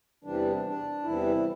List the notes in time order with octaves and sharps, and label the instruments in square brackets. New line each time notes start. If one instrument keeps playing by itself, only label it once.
[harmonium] E2 C3 E3 G3 D4
D4
E2 C3 E3 G3 E4